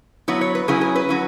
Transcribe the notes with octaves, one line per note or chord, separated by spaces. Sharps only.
F#3 B3 E4 C#5
C#5
B4
C#3 F#3 C#4 E4 G#4
G#4
B4
F#3 C#4 E4